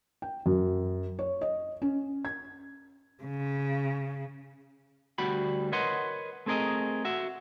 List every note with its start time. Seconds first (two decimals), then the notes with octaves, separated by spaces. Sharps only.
0.22 G5
0.46 F#2
1.19 C#5
1.41 D#5
1.82 C#4
2.25 G#6
3.23 C#3
5.18 D2 G3 F#4 B5
5.72 A#4 B4 C#5 D#5 F#5 C6
6.46 A3 C4 G#4 A#4 D#5
7.05 F#4 E5